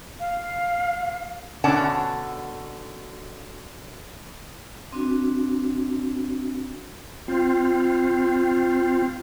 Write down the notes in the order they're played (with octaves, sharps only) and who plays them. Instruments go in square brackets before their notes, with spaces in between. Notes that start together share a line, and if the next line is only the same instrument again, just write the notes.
[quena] F5
[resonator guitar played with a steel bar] B2 D3 C#4 D5 F#5 A5
[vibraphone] C4 D4 F#4
[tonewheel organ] C4 F4